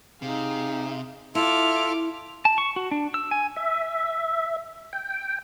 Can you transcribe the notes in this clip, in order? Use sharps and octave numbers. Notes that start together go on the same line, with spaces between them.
C3 D#4 G#4 F5
E4 F4 A4 E5 D6 F6
A5
C#6
F#4
D4
E6
G#5
E5
G5